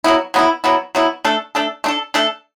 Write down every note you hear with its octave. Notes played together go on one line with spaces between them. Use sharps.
F#3 B3 E4
F#3 B3 E4
F#3 B3 E4
F#3 B3 E4
A3 D4 A4
A3 D4 A4
A3 D4 A4
A3 D4 A4